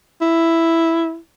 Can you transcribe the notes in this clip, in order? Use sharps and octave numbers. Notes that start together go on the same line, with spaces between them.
E4